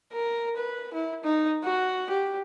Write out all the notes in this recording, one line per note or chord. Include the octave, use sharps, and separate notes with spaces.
A#4
B4
E4
D#4
F#4
G4